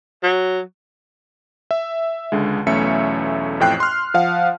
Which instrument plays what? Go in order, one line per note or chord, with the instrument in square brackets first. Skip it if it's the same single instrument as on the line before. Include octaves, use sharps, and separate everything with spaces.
[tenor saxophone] F#3
[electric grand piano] E5
C#2 D3 G#3
B1 E2 A3 C#4 E5 C#7
A1 F2 A2 G5 F#6 C7
C6 F6
F3 F5 F#5